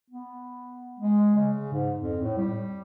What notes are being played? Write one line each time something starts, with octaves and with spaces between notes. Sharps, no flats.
B3
G#3
C#3
G#2
F2
A2
G3